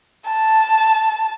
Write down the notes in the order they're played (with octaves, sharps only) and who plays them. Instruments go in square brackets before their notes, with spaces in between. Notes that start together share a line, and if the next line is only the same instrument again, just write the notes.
[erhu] A5